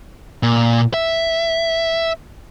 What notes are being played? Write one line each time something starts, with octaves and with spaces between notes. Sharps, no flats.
A#2
E5